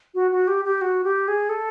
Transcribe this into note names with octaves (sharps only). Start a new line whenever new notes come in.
F#4
F#4
G4
G4
F#4
G4
G#4
A4